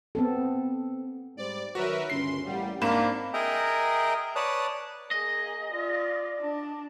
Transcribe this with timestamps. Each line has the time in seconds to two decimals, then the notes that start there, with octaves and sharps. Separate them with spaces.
0.15 B3 C4 A4
1.37 G#2 G3 C5 D5
1.75 D#3 F#3 F#4 A#4 B4 E5
2.10 G1 C#2 C#4 C6 C7
2.46 A1 G3 A#3 F#5
2.82 G#2 A#3 C4 D4 D5 B5 E7
3.34 G#4 A#4 D#5 E5 G5 A#5
4.36 B4 C#5 D5 A5 D#6 F#6
5.11 A#3 G#4 D#5
5.72 F4 D5
6.41 D4